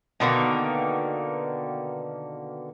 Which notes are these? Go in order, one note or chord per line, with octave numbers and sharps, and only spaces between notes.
B2 D3 D#3 A#3